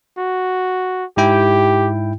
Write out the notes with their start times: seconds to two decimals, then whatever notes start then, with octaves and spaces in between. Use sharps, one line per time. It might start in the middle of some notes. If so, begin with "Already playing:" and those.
0.18 F#4
1.17 G#2 E4 G4 G5